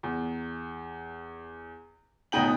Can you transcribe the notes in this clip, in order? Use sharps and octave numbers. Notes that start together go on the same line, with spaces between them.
E2
D#1 D2 B3 D#4 G5 F#7